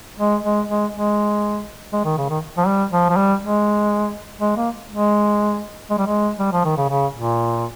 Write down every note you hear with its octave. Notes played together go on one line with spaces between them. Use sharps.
G#3
G#3
G#3
G#3
G#3
D#3
C#3
D#3
F3
G3
F3
F3
G3
G#3
G#3
A#3
G#3
G#3
G3
G#3
G3
F3
D#3
C#3
C#3
A#2